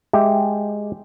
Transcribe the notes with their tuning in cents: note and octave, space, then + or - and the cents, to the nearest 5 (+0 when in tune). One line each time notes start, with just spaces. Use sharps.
G#3 +0 G4 +0 E5 +5